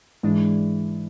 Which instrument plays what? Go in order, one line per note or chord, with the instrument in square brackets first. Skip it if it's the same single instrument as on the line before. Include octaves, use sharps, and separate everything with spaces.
[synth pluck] G#2 G#3 D4 [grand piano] E3